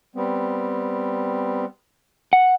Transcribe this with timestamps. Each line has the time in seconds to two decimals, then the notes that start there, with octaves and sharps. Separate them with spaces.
0.15 G3 B3 C4
2.33 F#5